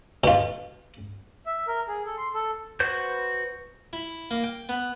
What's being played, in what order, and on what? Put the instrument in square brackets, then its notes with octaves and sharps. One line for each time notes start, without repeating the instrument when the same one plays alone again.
[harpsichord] B2 F4
[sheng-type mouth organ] E5
A#4
G#4
A4
C6
A4
[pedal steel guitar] F#4 B4 C5 G6
[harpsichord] E4
A#3
G5
B3